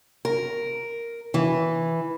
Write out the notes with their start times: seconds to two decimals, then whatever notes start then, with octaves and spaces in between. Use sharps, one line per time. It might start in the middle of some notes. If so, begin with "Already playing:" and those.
0.25 A#4
1.34 E3